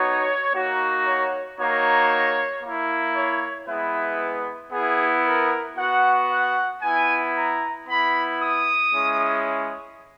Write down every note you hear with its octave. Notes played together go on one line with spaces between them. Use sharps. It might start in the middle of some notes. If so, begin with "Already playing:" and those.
Already playing: B3 D#4 F#4 C#5
A#3 D#4 F#4
C#5
A#3 D#4 F#4 C#5
A#3 E4
C#5
G#3 B3 E4 B4
B3 E4 G#4
A#4
B3 F#4 F#5
F#5
B3 E4 G#5
A#5
B3 E4 B5
D#6
G#3 C#4 E4